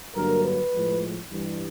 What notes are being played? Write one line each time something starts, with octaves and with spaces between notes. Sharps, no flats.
G2 D3 F#3 A#3 A#4
B4
A2 F3 G#3
G2 E3 G3